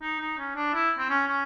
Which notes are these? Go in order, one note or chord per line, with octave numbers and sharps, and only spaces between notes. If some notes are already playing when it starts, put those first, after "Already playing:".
D#4
D#4
C#4
D4
E4
C4
C#4
C#4